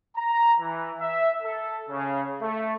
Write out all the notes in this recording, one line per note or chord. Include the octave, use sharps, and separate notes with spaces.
A#5
E3
E5
A4
C#3
A3